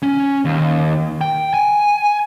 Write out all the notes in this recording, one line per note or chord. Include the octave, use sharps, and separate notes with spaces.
C#4
D#2
G5
G#5